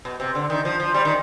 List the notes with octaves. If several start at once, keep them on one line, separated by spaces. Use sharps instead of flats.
B2
C3
D3
D#3
F3
F3
G3
D#3